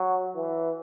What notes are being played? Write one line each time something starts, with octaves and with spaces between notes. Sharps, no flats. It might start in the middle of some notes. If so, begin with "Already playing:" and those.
Already playing: F#3
E3